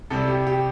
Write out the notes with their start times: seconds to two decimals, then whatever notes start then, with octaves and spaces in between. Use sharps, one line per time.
0.10 C2 C3 G3 A4
0.28 G4
0.47 G4